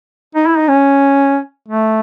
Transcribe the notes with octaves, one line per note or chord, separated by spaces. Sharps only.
D#4
E4
D#4
C#4
A3